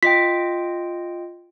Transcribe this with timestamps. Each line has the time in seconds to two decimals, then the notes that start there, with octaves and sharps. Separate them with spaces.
0.03 F4 D#5 G5 B6